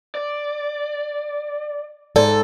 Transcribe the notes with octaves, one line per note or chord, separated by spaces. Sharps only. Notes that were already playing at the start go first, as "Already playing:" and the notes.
D5
G#2 A4 D5